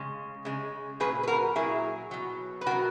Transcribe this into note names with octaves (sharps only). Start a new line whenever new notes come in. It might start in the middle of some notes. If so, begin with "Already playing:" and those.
Already playing: C#3 G#3
C#3 G#3
A#2 F#3 G#4 B4
B4
F#4 A#4
A#2 F#3 E4 G#4
B2 F#3
B4
B2 F#3 F#4 A#4